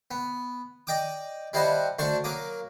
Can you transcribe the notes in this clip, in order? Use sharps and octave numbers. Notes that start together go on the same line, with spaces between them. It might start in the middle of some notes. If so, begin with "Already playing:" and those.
B3
D5 D#5 G5 D6 D#6
G3 E4 C5 D#5 F#5 A5
D2 D4 C5 A5 C#6
F#3 A#3 D6 D#6